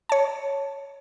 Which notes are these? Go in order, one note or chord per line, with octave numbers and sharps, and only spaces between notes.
C#5 A5